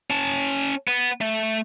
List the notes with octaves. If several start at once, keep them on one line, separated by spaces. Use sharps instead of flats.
C#4 A5
B3
A3